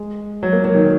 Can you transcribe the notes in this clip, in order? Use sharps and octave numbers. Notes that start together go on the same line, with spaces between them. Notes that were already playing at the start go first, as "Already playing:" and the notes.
Already playing: G#3
F#3
A#3
F#3
D#3